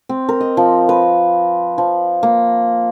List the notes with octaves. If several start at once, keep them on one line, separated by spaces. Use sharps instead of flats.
C4
A#4
D#5
F3
B4
F3
A#3